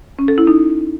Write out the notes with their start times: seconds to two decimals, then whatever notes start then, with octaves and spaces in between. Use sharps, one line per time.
0.19 C#4
0.28 A4
0.38 E4
0.47 D#4